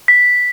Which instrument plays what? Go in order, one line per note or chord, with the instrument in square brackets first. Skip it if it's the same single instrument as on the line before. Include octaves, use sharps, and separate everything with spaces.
[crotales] B6